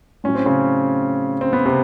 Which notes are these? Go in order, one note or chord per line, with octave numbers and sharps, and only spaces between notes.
A2 F#3 C#4
C4
C#3 C#4
C4
B3
C3 C4